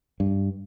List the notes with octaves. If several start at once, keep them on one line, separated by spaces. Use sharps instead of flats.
G2